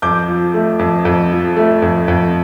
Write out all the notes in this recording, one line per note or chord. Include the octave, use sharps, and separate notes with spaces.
F2 D6 G6
F3
A3
F2
F2
F3
A3
F2
F2